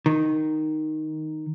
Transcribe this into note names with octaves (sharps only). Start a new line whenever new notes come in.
D#3